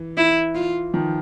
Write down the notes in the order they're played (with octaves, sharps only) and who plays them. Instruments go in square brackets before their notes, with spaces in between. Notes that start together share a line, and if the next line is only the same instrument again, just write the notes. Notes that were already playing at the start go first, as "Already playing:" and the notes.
Already playing: [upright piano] E3
[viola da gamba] E4
F4
[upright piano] D#3 F3